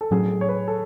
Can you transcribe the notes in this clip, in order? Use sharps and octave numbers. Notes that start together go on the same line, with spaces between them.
A4
A2 F#3 C#4 G#4
C#5
B4
A4